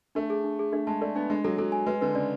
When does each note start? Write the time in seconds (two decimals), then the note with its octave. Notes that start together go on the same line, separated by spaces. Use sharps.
0.15 A3 D4
0.30 G#4
0.44 D4
0.59 G#4
0.72 A3 D4
0.87 G#3 A5
1.01 A3 D5
1.15 B3 D4
1.30 G#3 D4
1.44 F#3 A4
1.58 F#3 A4
1.72 G#5
1.86 G#3 B4
2.01 D3 B4
2.15 C#3 D5